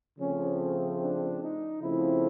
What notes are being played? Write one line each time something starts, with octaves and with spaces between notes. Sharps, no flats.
C#3 F3 A3 C4 C#4
D4
D#4
C#3 F3 A3 C4 E4